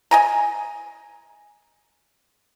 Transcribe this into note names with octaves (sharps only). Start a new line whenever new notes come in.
D#5 G#5 A#5